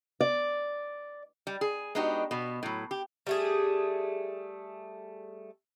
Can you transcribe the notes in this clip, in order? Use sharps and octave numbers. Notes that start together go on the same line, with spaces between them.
D5
G3
G#4
G#3 B3 D4 D#4 F#4 G4
B2 B3
A2 F#3
G4
G3 A3 G#4